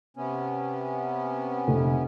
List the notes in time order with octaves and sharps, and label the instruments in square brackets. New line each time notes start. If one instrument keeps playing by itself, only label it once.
[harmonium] C3 B3 C#4
[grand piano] F1